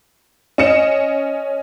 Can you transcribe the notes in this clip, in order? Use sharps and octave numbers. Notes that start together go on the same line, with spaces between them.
C#4 D#5 C#7 E7